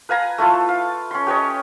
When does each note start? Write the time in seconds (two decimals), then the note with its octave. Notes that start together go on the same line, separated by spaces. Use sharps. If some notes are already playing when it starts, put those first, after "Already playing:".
0.09 B4 F5 G#5 A#5
0.38 A3 E4 F4 A4
0.69 F5
1.11 C#4 C6
1.27 G4 B4 C#5 D#5